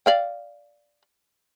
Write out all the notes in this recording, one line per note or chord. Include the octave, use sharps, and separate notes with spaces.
D5 F5 G5